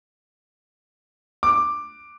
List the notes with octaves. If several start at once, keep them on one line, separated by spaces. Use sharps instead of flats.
D6